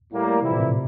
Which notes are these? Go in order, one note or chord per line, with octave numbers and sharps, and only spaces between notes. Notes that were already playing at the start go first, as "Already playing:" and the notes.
A2 G3 A#3
F2 C3 E3 G3 C4 E4
A#2
A2 C3